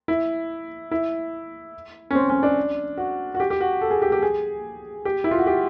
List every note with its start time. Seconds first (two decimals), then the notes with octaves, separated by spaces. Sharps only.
0.08 E4
0.91 E4
2.11 C#4
2.15 C4
2.30 C#4
2.43 D4
2.97 F#4
3.34 F#4
3.40 G4
3.50 G4
3.61 F#4
3.81 A4
3.91 G#4
4.02 G4
4.12 G4
4.22 G#4
5.05 G4
5.24 E4
5.31 F4
5.39 F#4
5.47 G4